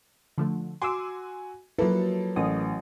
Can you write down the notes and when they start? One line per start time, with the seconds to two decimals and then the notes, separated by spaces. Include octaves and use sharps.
0.38 D3 F3 A3
0.82 F#4 G#5 C6 D6 E6
1.79 F3 F#3 A#3 E4 A4 B4
2.36 A1 D#6